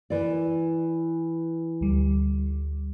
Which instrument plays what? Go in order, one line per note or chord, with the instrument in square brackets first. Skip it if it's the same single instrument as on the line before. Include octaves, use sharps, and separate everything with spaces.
[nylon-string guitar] E3 D5
[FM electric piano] D2 G3